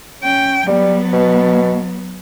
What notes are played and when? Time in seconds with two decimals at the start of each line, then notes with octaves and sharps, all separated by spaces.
0.23 C#4 G5
0.67 F#3 G3 B3
1.13 B2